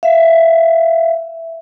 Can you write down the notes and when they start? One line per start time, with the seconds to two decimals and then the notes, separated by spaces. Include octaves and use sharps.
0.03 E5 F5